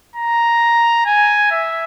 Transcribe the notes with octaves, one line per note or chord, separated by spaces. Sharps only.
A#5
G#5
E5